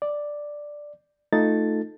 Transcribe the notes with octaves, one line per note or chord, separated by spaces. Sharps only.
D5
A3 D#4 F4 A4 A6